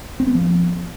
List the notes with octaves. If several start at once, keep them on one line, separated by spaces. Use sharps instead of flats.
C4
B3
F3